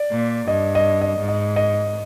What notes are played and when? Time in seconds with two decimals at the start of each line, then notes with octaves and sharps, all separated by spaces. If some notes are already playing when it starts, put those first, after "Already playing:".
Already playing: D5
0.11 A#2
0.47 G2 D#5
0.75 D#5
1.02 D#5
1.20 G#2
1.29 D#5
1.56 D#5